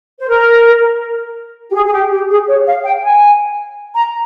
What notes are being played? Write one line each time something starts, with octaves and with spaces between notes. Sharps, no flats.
C5
A#4
G4
G#4
G#4
G4
G4
G#4
C#5
F5
G5
G#5
A#5